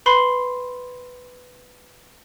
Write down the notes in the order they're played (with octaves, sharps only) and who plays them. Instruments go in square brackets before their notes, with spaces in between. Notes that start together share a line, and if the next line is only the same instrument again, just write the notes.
[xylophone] B4 B5 C6 C7 G7